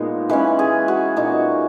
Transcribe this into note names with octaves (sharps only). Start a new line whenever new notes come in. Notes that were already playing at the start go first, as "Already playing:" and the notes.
Already playing: A#2 G#3 B3 D#4
E3 G#3 C#4 B4
G#4
F#4
A#2 A#3 D#4